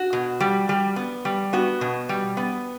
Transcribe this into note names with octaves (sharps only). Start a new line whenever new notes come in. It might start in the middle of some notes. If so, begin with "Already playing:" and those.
Already playing: F#4
B2
G3
G3
B3
G3
B3 F#4
B2
G3
B3